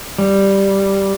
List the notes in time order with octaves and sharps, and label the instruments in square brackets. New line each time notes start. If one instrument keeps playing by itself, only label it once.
[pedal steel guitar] G3